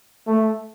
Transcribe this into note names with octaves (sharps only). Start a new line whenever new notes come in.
A3